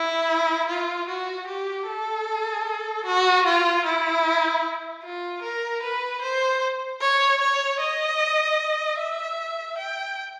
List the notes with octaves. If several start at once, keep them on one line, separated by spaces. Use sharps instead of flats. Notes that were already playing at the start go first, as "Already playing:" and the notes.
Already playing: E4
F4
F#4
G4
A4
F#4
F4
E4
F4
A#4
B4
C5
C#5
C#5
D#5
E5
G5